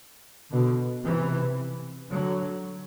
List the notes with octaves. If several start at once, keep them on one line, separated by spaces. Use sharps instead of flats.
B2 D3
C3 E3
D3 F#3